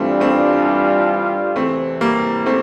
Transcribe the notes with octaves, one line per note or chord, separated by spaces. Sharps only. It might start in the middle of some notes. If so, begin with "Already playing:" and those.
Already playing: G2 E3 G3 A3 C4 D4 F4
A3 C4
E2 C3 E3 A3 C4
G3 A#3
A3 C4